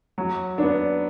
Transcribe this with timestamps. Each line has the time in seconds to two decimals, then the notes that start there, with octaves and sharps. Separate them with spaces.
0.18 F#3
0.58 B3 D4